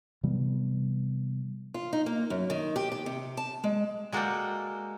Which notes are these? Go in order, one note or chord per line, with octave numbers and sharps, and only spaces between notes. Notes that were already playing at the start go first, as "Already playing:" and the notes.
C3 E3 G3 B3
F4
D#4
A#3
F#2
D#3
G4
G4
C3
A5
G#3
G#3 A#3 F#4 A4 D5 G5